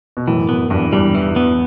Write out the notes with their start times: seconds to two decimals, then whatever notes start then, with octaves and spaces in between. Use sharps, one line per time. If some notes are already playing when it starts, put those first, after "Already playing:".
0.17 B2
0.27 F#2 A2 E3
0.49 F#2 B3
0.70 E2 G2 E3
0.92 E2 G2 G3
1.15 E3
1.36 B3